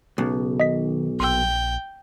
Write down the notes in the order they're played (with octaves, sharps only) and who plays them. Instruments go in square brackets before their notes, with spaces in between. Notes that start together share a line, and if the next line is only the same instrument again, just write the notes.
[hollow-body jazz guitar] B1 [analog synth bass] C#3
[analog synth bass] D#3 [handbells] D#5 B6
[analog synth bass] A#1 [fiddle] G5 [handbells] C6 E6